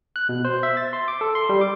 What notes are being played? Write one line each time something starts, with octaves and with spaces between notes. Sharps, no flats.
F#6
B2
C5
E5
A6
C6
D6
A4
C6
G3
D6